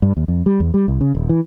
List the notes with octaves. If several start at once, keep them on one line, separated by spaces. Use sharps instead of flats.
G2
D#2
F2
G3
E2
G3
C2
C#3
D#1
E3